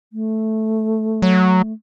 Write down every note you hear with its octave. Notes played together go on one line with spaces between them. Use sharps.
A3
F#3